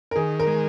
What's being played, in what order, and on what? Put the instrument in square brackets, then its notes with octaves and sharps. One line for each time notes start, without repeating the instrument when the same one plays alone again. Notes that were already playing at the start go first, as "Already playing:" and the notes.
[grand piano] A#4
[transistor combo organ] D#3 [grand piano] G#4
[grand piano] A#4
[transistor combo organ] G#3